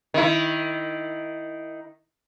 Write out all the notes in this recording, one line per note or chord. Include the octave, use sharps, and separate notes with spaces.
D#3 E4